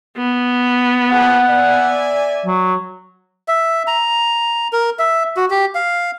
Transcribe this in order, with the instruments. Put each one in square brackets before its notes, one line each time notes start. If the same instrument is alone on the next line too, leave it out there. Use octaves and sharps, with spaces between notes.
[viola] B3
[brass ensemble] F3 G3 G#4 [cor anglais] F#5
[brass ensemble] D5 E5 G#5
[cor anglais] F#3
[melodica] E5
A#5
A#4
E5
F#4
G4
F5